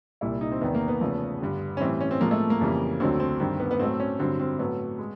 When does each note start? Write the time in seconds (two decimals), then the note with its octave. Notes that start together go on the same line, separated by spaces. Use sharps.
0.21 C2 A#2 G3 E4
0.41 D#4
0.52 C4
0.61 E2 C3 D#3 B3
0.75 A#3
0.88 B3
1.01 E2 C#3 F3 A3
1.40 G2 D3 G3
1.77 C#4
1.80 A2 E3 G3 C4
2.01 C#4
2.11 C4
2.20 A2 F3 G#3 A#3
2.31 A3
2.50 A#3
2.61 F2 C#3 E3 G3
3.00 D2 D3 F#3 A3 C4
3.20 C4
3.40 G2 D#3 G3 C4
3.60 B3
3.71 B3
3.80 A2 F#3 A3 C4
4.00 C#4
4.19 G2 D3 F#3 C4
4.40 C4
4.59 A2 F#3 A3 B3
4.99 G#3